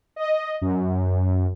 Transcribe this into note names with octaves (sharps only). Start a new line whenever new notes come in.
D#5
F#2